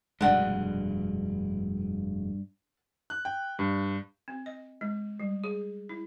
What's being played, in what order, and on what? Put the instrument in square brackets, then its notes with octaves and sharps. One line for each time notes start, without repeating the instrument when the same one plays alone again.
[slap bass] F1 B2 G#3 [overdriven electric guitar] G2 [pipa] D4 F#5
[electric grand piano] F#6
G5
G2
[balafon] C4
D#5
G#3
G3
G#4
E4